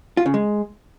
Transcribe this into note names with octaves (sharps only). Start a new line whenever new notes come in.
F4
C#3
G#3